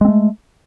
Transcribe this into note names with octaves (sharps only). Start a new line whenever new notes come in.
G#3 A3 C4